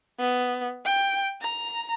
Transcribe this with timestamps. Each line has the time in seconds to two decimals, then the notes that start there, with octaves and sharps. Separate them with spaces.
0.19 B3
0.85 G5
1.42 A#5